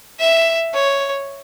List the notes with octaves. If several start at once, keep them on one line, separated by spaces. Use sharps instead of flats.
E5
C#5